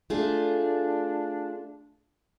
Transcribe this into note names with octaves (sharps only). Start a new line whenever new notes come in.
A3 D4 F4 G#4